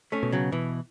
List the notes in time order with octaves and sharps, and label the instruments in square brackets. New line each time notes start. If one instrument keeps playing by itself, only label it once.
[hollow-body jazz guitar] A3 C#4
[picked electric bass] B2
[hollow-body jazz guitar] C#3 F#3
[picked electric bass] B2 [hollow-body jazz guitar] E3